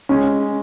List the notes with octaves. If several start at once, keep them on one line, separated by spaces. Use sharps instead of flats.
G#3 C#4